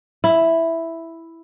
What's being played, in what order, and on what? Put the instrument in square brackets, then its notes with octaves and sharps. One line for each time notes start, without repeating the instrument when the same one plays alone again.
[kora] E4